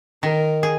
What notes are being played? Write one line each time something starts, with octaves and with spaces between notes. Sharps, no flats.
D#3 A#4
G#4